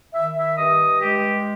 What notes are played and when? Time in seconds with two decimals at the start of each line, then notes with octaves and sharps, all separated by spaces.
0.13 D#3 E5
0.37 E5
0.57 G2 D#5
1.01 G#3 G4